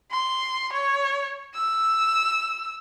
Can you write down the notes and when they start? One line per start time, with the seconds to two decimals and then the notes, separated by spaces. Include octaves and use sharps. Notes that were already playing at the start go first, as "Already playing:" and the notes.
0.11 C6
0.73 C#5
1.55 E6